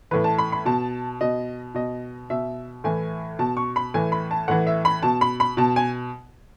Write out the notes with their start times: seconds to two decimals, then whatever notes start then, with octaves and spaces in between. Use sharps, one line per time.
0.11 A2 E3 B4
0.24 A5
0.38 B5
0.52 B5
0.65 B2 A5
1.21 B2 D#5
1.75 B2 D#5
2.30 B2 E5
2.84 A2 E3 G#5
3.39 B2 A5
3.57 C#6
3.76 B5
3.94 A2 E3 G#5
4.12 B5
4.31 A5
4.48 A2 E3 F#5
4.67 E5
4.85 B5
5.03 B2 A5
5.21 B5
5.40 B5
5.57 B2 A5
5.76 G#5